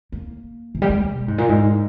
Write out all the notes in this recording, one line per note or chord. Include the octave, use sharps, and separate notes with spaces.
A#3
E3
G3
G#3
B2
G#2
A#2
G#2